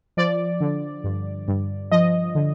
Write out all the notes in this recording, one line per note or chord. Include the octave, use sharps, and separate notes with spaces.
F3 D5
D3
G2
G2
F3 D#5
D3